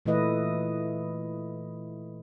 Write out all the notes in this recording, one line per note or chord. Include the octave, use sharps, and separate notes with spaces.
A#2 E3 A3 E4 B4 D#5